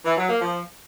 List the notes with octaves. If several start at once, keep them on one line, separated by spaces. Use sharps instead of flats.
E3
F#3
A#3
F3